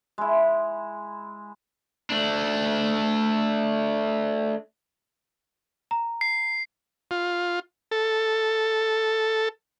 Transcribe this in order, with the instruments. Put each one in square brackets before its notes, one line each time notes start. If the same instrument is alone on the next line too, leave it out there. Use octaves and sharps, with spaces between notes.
[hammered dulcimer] G#3 E4
[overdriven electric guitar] A3 D4
[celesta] A#5
[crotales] C7
[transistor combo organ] F4
A4